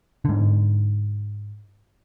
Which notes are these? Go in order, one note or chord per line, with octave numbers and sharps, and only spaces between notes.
G#2 D3